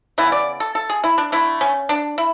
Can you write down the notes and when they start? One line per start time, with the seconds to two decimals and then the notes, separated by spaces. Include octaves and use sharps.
0.18 C#3 E3 B3 E4
0.32 D5
0.60 A4
0.75 A4
0.90 G#4
1.04 E4
1.18 D4
1.32 D3 A3 E4
1.61 C#4
1.89 D4
2.18 E4